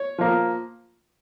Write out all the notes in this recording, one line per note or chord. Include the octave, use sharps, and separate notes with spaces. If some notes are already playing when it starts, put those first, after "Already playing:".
Already playing: C#5
F3 A#3